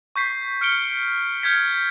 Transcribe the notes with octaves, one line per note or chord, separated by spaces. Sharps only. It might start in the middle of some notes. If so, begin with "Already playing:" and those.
C#6 G6 B6 C7
F6 C#7 D7 G7
F6 G6 G#6 B6 C#7